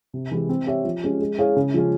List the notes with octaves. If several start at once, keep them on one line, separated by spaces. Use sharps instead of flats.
C3
E3 G#3 E4 G4
C4
G4 C#5 E5
F3
G#3 C#4 G4
G#3
E4 G#4 C#5 F5
C#3
F3 G#3 C#4